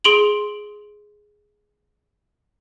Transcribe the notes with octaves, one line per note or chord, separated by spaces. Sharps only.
G#4 C6 D7 F7 F#7